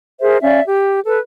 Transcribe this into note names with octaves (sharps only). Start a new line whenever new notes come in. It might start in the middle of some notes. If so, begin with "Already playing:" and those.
G#4 A#4 C5 E5
C#4 D5 E5 F5
G4
A4 B4